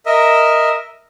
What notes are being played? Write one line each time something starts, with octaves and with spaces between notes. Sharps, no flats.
A#4 D#5 E5